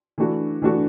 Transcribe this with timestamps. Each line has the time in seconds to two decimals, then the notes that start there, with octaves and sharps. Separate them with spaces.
0.18 E3 A3 D4 F#4
0.62 E3 A3 D4 F#4